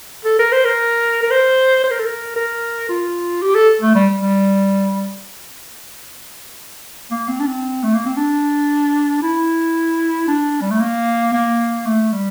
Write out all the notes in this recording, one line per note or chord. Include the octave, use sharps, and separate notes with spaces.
A4
A#4
C5
A#4
A#4
C5
C5
A#4
A4
A#4
A#4
F4
G4
A4
A3
G3
G3
A#3
C4
D4
C4
A3
A#3
C4
D4
E4
D4
G3
A3
A#3
A#3
A3
G3